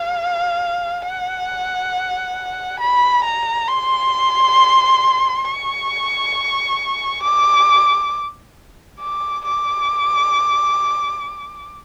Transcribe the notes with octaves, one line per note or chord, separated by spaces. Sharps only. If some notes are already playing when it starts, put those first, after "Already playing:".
Already playing: F5
F#5
B5
A#5
C6
C#6
D6
D6
D6